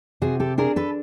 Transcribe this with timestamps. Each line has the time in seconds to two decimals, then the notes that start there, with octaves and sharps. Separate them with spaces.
0.22 C3 F#4 G#4
0.40 G4 A4
0.58 D4 G#4 A#4
0.76 A4 B4